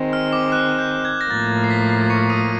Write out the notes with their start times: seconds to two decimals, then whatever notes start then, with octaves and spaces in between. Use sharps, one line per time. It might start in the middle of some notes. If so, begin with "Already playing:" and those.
Already playing: D#3 G#3 C4
0.13 F6
0.33 D6
0.52 F#6
0.79 G6
1.05 G#6
1.21 A#6
1.31 A2 F3 A#3 A6
1.64 C7
1.70 B6
1.90 C7
2.10 C#6 C#7
2.30 D#6 D#7